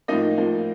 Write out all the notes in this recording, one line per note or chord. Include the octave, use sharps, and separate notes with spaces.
A2 F3 A#3 D#4 D#5
A2 F3 A#3